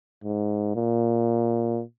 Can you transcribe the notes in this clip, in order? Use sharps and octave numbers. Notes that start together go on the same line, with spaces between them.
G#2
A#2